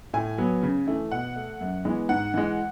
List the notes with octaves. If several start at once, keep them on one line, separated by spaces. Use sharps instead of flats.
A2 G#5
F#3 B3
C#3
E3 A3
B2 F#5
A3
F#2
E3 G#3 B3
G#2 F#5
E3 G#3